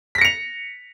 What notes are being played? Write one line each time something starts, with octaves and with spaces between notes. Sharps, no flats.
A#6 B6 C#7 F7